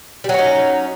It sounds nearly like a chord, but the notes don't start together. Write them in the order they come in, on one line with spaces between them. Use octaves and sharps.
G3 F#3 C#4 D#4